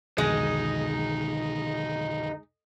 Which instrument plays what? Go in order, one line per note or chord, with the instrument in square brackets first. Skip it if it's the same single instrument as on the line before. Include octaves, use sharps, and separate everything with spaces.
[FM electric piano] C2 F2 [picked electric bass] B2 D3 D#3 [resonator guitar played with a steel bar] G#3 [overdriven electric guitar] D#4